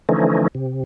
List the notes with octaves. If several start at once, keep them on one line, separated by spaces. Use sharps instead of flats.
D3 E3 F3 A3 C#4 D#4
C3